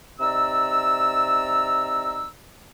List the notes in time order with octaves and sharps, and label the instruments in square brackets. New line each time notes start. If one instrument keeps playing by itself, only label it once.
[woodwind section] C3 D#4 D5 A#5 E6